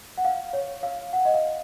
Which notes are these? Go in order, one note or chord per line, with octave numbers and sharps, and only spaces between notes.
F#5
F5
C#5
F5
F#5
D#5
F5